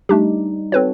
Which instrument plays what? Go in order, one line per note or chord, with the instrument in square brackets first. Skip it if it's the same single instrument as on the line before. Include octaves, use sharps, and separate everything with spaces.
[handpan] G3 D#4 [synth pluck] A3 D4 G4
[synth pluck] C4 B4 C#5 [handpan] F#4 A4